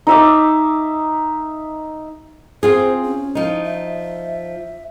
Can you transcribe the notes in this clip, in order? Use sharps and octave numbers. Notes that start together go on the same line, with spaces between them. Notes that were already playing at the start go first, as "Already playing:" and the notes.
D#4 E5 D6
C4 F4 G#4 C5
C#4
F3 D#4
E5